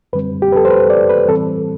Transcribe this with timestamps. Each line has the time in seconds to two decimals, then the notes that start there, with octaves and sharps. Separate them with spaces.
0.13 F#2 D3 G3 C4 B4
0.42 G4
0.52 B4
0.56 A4
0.65 C5
0.71 B4
0.90 D5
1.10 B4
1.28 A2 E3 G3 C4 A4